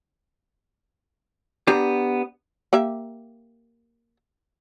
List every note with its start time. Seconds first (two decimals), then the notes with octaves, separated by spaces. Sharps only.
1.67 B3 D4 G4 A#5
2.73 A#3 G4 E5